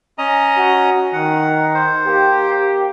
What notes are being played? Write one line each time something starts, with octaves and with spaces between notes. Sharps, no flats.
C#4 D#5 A#5
F#4
D#3 F#5
C5
A#3 G4